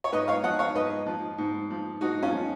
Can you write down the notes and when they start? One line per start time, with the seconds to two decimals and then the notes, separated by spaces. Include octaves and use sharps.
0.04 C#5
0.12 G#2 B4 D#5
0.28 C#5 F5
0.43 F3 D#5 F#5
0.59 C#5 F5
0.75 G#2 B4 D#5
1.06 F3
1.38 G#2
1.70 F3
2.01 G#2 D#4 F#4
2.23 C#4 F4
2.33 F3